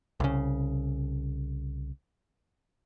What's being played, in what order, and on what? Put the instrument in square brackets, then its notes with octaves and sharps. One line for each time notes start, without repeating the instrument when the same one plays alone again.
[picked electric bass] C2 C#3